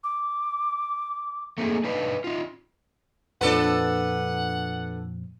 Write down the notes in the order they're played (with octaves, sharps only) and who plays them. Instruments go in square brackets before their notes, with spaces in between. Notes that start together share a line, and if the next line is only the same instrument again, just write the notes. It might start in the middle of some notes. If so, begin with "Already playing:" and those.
[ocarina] D6
[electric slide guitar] A3 A#3 C4 C#4 D#4 G#4
D4 D#4 B4 F5
D#4 F4
[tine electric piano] F2 A#2 F3 [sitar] D4 A4 B4 [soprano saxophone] F#5